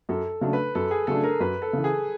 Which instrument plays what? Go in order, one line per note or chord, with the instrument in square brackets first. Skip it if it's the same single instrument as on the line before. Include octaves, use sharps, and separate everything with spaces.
[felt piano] F#2 [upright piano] A4
[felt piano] C#3 F#3 A3 D4
[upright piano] B4
[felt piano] F#2 [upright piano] A4
[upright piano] G#4
[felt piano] C#3 F#3 A3 D4 [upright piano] A4
[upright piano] A#4
[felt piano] F#2 [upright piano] B4
[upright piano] A4
[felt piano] C#3 E3
[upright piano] G#4